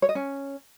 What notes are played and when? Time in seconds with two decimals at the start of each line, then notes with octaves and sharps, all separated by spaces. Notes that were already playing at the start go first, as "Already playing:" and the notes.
0.02 C#5
0.09 D#5
0.15 C#4